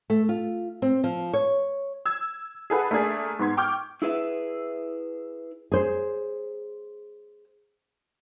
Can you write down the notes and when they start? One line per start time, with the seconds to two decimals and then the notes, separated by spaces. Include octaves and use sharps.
0.10 A3
0.29 F4
0.82 C4
1.04 F3
1.33 C#5
2.06 E6 G#6
2.70 G#4 A4 B4 F#5
2.91 A3 A#3 D4 G#4
3.39 G#2 B3 C6 G#6
3.57 G5 C#6 D6 F6 G6
4.02 E4 G#4 B4 E5
5.72 G#4 C5